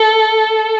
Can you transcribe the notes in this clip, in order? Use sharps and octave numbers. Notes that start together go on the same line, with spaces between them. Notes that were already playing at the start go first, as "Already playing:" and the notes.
Already playing: A4